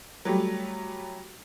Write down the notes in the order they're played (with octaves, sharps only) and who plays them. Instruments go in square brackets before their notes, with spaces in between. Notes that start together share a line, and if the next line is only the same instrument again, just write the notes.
[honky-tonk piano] F#3 G3 A3